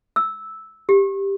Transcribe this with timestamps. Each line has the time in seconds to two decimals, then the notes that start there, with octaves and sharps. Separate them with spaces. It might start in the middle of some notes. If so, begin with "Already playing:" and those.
0.16 E6
0.89 G4